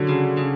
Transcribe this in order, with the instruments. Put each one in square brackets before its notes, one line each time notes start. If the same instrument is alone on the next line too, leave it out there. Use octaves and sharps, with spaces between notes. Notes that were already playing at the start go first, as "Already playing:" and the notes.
Already playing: [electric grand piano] D3 [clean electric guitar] F#3
[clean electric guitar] C#3
C#3